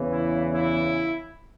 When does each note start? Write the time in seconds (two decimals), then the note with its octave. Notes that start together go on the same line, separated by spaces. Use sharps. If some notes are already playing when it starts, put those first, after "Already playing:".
Already playing: E2 C#3 E3
0.12 E4
0.55 E4